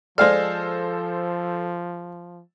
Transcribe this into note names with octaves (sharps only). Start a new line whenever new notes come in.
F3 G#3 A4 C5 D5 F5 F6